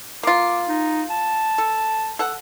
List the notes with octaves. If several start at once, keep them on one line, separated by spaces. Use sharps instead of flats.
A#3 F4 D6
D#4
A5
A4
A4 F#5